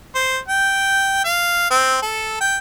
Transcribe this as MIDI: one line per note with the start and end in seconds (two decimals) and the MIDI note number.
0.15 0.38 72
0.48 1.21 79
1.24 1.70 77
1.70 2.02 60
2.02 2.40 69
2.41 2.57 79